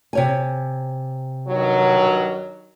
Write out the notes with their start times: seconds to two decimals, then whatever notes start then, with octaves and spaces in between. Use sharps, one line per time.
0.13 C3 C#5 G#5
1.48 G2 D#3 F#3